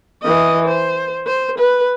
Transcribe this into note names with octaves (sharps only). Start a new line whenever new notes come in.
E3 D#5
C5
C5
B4